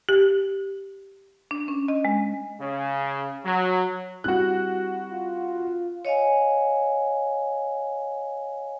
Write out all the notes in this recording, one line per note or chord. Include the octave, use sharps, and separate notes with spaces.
G4
D4
C#4
D#5
G#3
C#3
F#3
G3 C4 E4 F#4 F#6
F4
C#5 D#5 F5 G#5